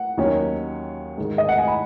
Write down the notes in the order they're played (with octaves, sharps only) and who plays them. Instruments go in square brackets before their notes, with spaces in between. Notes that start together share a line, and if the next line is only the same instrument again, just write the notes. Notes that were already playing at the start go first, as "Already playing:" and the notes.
Already playing: [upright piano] F#5
D#2 D#3 F#3 C#4
G#2 D#3 G#3
D#5
F#5
G#5
B5